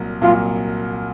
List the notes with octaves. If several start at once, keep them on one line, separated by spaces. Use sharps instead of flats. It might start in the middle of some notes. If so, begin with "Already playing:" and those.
Already playing: C2 A#2 F#3
C2 A#2 F#3 F4